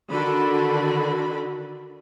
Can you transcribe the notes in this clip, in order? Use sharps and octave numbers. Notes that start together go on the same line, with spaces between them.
D3 D#3 D4 F#4 A4 B5